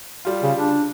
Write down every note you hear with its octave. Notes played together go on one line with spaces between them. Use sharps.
G3 F4
C#3
D4